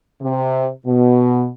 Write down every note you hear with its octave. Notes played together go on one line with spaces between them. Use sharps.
C3
B2